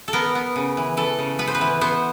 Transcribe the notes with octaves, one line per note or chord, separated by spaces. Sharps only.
A4
B3 A#4
B3
C#3
E3
E3 A4
C#3
B3 B4
C5
B4
E3
B3 C5